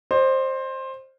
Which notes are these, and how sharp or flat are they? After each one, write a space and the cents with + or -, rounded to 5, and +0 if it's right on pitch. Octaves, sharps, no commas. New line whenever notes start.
C5 +15 D#5 -45